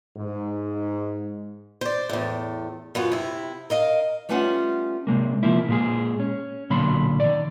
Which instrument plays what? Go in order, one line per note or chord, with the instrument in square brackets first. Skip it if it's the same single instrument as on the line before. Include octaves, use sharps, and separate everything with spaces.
[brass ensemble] G#2
[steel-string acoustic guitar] C5 D5
E2 A2
F#2 B3 F4
C3 E4
A#4 D#5 F5
[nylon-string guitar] G3 A3 B3 C#4 F4 F#5
[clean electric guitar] C3 D#3 G#3 A#3
C3 F3 A#3 E4
A#2 G#3 G#4
C#4
B1 A#2 D3 F#3 B5 C6
D#3 D5